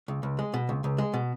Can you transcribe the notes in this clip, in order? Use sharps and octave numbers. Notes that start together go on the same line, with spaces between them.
C#2
C#2
G#3
B2
C#2
C#2
G#3
B2